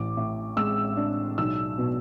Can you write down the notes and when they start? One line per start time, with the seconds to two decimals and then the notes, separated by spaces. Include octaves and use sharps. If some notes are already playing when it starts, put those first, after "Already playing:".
Already playing: A1 D6
0.17 A2
0.56 G#3 E6
0.97 D4
1.38 B1 E6
1.78 B2